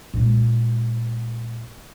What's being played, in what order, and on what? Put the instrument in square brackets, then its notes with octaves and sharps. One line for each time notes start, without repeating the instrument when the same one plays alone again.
[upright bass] A#2 G#3